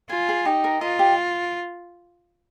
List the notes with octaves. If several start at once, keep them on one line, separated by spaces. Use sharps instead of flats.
F4 G#5
G#4
D#4 G4
A#4
F4 D#5
G4